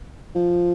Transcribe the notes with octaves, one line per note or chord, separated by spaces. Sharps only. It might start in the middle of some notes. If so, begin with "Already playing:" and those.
F3